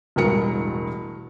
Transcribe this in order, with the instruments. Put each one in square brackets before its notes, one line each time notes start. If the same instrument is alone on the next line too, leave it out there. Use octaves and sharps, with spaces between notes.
[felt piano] E1 A1 G2 A#4 C#7